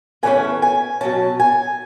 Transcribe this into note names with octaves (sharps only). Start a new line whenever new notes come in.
E2 C#3 E3 A3 C#4 G#5
G#5
B2 F#3 C#4 A5
G#5